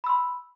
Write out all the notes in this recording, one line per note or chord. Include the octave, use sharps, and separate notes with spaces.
B5 C6 E6